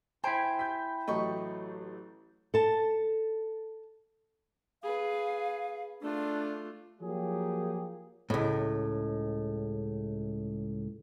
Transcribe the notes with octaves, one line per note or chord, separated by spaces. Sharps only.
E4 C5 G5 G#5
G6 B6
A1 F#3 A3 D#5 B5 C#6
A4 A5
G#4 B4 F5
A3 D4 F4
F3 F#3 A#3 G4 G#4
C#2 A2